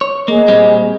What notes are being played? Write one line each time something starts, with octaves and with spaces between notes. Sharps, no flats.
C#5
A#3 G#4 D#5
A#2 G3 C4